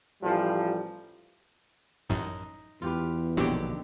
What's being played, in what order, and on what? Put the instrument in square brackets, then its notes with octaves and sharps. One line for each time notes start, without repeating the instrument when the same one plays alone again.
[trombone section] A1 F3 G3
[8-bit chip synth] A1 F#2 [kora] D#4
[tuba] E2 [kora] F4 G4 B4
[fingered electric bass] A#1 B2 [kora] D3 D#3 C4 [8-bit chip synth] F#3 G4